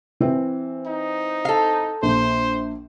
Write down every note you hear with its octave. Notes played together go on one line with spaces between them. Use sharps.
E3 C4
D#4
A4 F5
A#1 A#3 C5